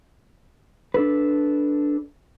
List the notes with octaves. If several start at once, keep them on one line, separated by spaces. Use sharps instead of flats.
D4 A4 B4